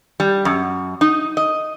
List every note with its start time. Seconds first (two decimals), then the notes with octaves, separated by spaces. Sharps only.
0.20 G3
0.45 F#2
1.01 D#4
1.37 D#5